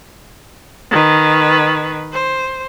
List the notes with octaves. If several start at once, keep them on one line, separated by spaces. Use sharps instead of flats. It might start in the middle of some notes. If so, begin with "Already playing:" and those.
D#3 B4
C5